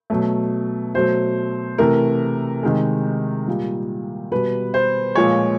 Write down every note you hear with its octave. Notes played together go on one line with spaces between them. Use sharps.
B2 F#3 A3
B2 F#3 A3 C5
C3 E3 A3 A#4
C3 D#3 G#3
A#2 G3
B2 G3 B4
C5
A#2 F3 G#3 C#5